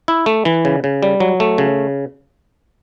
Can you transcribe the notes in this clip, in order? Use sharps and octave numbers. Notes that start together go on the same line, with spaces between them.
E4
A3
E3
C#3
C#3
G3
F#3
A3
C#3